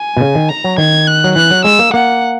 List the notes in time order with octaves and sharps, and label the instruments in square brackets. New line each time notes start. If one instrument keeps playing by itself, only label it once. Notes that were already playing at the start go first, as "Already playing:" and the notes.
Already playing: [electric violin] G#5
[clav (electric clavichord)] B2
C#3
D#3
[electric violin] A#5
[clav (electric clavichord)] F#3
[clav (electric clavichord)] D#3 [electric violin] G#6
[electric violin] F#6
[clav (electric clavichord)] F#3
[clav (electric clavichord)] E3 [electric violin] F#6
[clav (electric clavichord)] F#3
[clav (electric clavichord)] G#3 [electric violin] E6
[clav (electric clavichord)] A#3
[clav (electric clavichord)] A#3 [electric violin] F#5